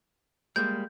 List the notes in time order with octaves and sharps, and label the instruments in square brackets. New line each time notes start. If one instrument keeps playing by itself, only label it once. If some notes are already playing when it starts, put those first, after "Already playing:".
[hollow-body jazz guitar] G3 G#3 A#3 [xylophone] G6